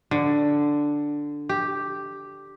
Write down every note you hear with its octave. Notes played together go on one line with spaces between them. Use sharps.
D3
G4